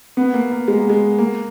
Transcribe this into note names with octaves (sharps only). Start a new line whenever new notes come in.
B3
A#3
A#3
G#3
A#3
G#3
A#3